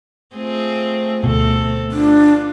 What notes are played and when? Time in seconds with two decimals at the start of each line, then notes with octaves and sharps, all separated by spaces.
0.36 A3 C4 F4 G#4
1.24 D2 B2 C4 A4
1.92 B3 D4 F4